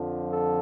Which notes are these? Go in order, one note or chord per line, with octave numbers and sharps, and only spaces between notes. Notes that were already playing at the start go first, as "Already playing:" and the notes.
Already playing: F2 D3 F3
A4